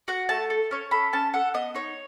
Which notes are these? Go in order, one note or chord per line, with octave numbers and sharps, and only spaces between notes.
F#4 F#5
A3 A5
A4
C#4 C#5
A4 B5
C#4 A5
A4 F#5
B3 D#5
D#4 C#5